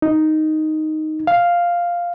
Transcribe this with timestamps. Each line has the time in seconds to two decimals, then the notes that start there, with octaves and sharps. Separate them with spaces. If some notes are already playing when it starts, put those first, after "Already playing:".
0.02 D#4
1.27 F5